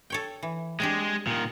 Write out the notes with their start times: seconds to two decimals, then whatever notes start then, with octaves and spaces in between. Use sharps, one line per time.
0.10 A4 C#5 G5
0.43 E3
0.80 G#3 C4 D4 G4
1.27 A#2 D#3